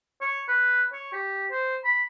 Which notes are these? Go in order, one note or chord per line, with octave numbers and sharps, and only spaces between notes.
C#5
B4
C#5
G4
C5
B5